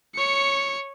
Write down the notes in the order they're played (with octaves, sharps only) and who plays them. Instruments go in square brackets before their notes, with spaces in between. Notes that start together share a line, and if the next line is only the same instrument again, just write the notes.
[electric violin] C#5 C#7